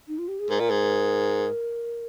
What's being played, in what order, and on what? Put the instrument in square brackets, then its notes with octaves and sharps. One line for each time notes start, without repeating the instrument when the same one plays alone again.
[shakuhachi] D#4
F4
G4
G#4
[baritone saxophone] G#2 [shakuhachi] A#4
[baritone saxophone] A#2
G#2